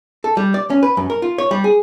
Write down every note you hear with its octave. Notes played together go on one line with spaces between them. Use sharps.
A4
G3
D5
C#4
B4
F#2
A#4
F4
C#5
G3
G#4